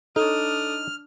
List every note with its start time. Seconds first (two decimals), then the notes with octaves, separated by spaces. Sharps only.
0.16 D4 D#4 A4 C#5 D#6 F6